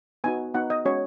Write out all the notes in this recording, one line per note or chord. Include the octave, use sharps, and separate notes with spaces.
B3 D#4 F#4 G#5
B3 D#4 F#4 F#5
D#5
G#3 C#4 F#4 C#5